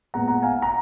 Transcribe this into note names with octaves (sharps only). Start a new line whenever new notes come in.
A#2 G#3 B3 F#5 A#5
F#5 A#5
F5 G#5
F#5 A#5